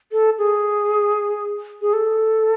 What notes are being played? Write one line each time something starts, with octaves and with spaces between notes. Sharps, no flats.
A4
G#4
G#4
A4